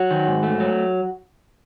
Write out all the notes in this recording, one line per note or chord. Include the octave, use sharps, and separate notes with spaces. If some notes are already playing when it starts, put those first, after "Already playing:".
Already playing: F#3 F#4
D#3
G#2
A3
F#3